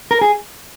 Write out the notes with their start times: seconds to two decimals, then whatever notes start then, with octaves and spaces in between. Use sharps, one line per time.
0.11 A#4
0.21 G#4